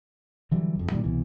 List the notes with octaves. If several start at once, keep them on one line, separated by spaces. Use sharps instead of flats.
D3 E3 F#3 G3
F#1 F2
A#2 D#3 G3
C2 B2 E3